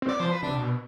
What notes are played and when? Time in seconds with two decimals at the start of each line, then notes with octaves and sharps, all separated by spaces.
0.02 C4
0.08 B3 D5
0.20 F3 C5
0.31 B4
0.43 C3 D4
0.54 B2